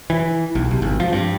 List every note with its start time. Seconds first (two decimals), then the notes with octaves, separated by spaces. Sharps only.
0.10 E3
0.55 B1
0.71 C2
0.82 G#1
1.00 F3
1.13 G2